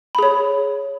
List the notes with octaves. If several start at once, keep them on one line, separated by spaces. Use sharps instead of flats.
G#4 C#5 B5